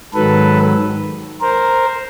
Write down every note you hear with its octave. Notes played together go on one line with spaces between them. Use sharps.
G#2 D#3 F#3 A4 B4
A#4 C5